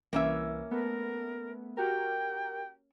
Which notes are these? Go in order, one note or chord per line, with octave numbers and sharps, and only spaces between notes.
C2 E3 A#3 C#4 E5
A3 B3 A#4
F#4 G4 A#4 G5